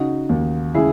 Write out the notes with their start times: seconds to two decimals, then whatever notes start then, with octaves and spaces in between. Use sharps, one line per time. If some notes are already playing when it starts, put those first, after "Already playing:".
Already playing: C#3 D#4 F#4
0.29 D#2
0.74 C#3 E4 G#4